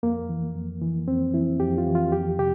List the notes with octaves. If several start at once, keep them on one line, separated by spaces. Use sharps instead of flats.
F2 A#3
E3
F2
E3
F2 C4
E3 E4
F2 G4
F4
E3
F4
F2 G4
C3 F3 G4